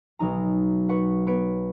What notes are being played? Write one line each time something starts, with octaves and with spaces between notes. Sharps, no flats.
B1 F#3 D#4 A#5
B4 F#5 C#6
B3 B4 C#5 D7